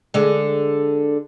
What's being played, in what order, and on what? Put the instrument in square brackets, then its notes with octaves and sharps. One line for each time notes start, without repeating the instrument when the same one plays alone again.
[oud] D3 G#3